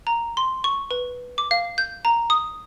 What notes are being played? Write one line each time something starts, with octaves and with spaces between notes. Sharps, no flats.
A#5
C6
C#6
B4
D6
F5
G6
A#5
D#6